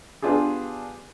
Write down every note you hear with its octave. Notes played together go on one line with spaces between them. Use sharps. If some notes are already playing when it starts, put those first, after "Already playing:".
B3 D4 F4 G4 G#4